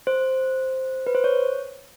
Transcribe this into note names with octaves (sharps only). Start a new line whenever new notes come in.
C5
B4
C5
C#5